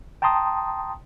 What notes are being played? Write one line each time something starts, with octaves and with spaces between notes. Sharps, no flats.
G5 A5 A#5 C6 D#6